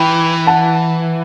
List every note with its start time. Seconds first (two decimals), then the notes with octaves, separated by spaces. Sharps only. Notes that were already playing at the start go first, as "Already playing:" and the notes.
Already playing: E3 G5 B5
0.47 F#5 A5